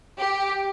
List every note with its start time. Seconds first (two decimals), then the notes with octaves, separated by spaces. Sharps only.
0.18 G4